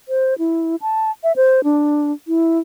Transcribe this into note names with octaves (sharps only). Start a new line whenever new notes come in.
C5
E4
A5
E5
C5
D4
E4